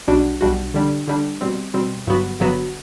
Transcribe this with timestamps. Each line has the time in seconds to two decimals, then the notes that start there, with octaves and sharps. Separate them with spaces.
0.08 B1 B2 G3 D4 F#4
0.41 B1 B2 G3 D4 F#4
0.74 D3 G3 D4
1.08 D3 G3 D4
1.41 B2 G3 C4
1.74 B2 G3 C4
2.07 G1 G2 F#3 B3 F#4
2.40 G1 G2 F#3 B3 F#4